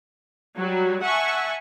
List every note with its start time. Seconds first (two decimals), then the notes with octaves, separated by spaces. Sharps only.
0.57 F#3 G3
1.01 E5 F#5 G#5 A5 C#6